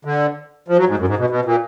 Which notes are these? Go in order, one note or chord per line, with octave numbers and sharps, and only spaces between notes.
D3
F3
F#3
G#2
F#2
G#2
B2
B2
A#2